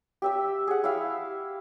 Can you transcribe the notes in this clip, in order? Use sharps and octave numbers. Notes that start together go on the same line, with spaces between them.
G4 E5 E6
G#4 F#5
E4 G4 E5 F5